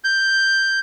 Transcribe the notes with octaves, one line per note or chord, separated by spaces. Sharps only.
G6